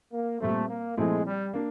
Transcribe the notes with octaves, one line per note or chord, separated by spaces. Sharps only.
A#3
A#2 G3 A3 C4
A#3
A#2 F3 G#3 A3 C4 E4
G3
A#3 D4